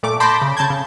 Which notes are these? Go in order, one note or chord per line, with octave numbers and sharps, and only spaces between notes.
A#2 A3 D6
A5 B5 C6 D6 G6 A#6
C#3
C#3 A5 G6 G#6
C#3